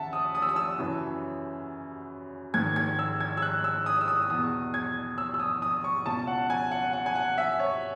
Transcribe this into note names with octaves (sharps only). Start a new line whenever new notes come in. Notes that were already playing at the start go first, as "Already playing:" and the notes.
Already playing: D#2 C#3 E3 E5 F#5 A5
D#6
D#6
E6
D#6
E6
F#2 C#3 E3
G#2 D#3 G#6
G#6
E6
G#6
E6
F#6
E6
D#6
E6
D#6
E2 B2 D#6
G#6
E6
E6
D#6
D#6
C#6
C#2 B2 A5
F#5
G#5
F#5
F#5
G#5
F#5
E5
C#5